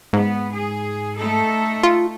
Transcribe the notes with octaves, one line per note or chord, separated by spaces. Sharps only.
G#2 B3
G#4
A3 D#4 A4
F4